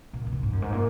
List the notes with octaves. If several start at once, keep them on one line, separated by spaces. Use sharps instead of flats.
A#2
A#2
G#2
G#2
F#2
G#2
A#2